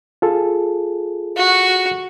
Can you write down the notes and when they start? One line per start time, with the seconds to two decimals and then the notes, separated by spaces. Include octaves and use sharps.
0.22 F4 G#4 A4
1.37 F#4